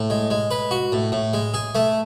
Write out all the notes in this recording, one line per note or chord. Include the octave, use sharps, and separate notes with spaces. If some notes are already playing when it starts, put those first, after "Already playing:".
Already playing: A2
G#3
G#3
B4
F#4
A2
A2
G#3
G#4
A3